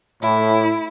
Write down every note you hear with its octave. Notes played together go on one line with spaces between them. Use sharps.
A2 E4